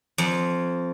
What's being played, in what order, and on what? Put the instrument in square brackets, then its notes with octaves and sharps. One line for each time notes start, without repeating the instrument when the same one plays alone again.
[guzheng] F2